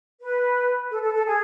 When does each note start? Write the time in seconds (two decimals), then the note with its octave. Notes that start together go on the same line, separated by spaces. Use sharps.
0.21 B4
0.91 A4
1.02 A4
1.14 A4
1.26 G#4